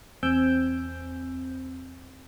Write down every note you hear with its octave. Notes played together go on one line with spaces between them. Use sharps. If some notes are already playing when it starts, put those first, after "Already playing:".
E2 C4 G#5 E6 G6 D7